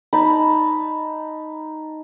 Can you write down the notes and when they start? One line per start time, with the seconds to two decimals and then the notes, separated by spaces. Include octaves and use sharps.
0.13 D#4 A5 B5